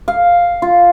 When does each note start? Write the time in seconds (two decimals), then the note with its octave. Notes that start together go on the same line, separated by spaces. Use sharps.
0.08 F5
0.62 F4